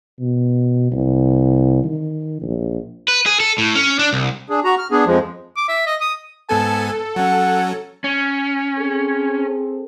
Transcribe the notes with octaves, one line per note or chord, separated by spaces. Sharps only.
B2
C2
D#3
A#1
B4
G#4
A4
A2
C#4
D4
C2
D4 G#4
F#4 A#5
F6
B3 D4 G#4
F2 F3 G#3
D6
E5
D#5
D#6
G#2 B3 A4 G#5 A5
F#3 C#4 F#5
C#4
C4 G#4 A4